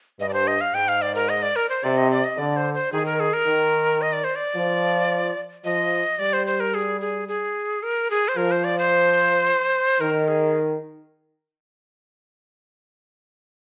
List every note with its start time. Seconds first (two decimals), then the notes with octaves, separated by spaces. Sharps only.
0.20 G2 D#5
0.29 D5
0.33 C5
0.47 D#5
0.61 F5
0.74 G#2 G5
0.88 F5
1.02 D5
1.15 A#4
1.29 D#5
1.43 D5
1.56 A#4
1.69 C5
1.84 C3 D5
1.97 D#5
2.11 D5
2.24 D#5
2.37 D3 D5
2.56 C5
2.74 C5
2.92 D#3 G#4
3.06 A#4
3.20 G#4
3.33 A#4
3.47 D#3
4.02 D#5
4.13 D5
4.24 C5
4.36 D5
4.55 F3
5.65 F3 D#5
6.19 G3 D5
6.33 C5
6.47 C5
6.60 A#4
6.74 G#4
7.01 G#4
7.28 G#4
7.83 A#4
8.10 G#4
8.28 C5
8.37 F3 A#4
8.51 C5
8.64 D5
8.79 C5
10.01 D#3 A#4
10.28 G#4